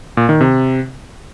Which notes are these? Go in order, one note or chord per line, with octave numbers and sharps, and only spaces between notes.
A#2
D#3
C3